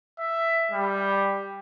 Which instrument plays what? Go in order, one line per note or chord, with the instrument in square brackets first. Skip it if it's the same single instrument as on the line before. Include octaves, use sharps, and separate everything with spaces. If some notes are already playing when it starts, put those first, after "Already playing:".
[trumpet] E5
G3